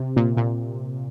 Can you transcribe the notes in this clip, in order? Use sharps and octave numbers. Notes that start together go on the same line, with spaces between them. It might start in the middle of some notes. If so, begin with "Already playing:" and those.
Already playing: C3
A#2
A#2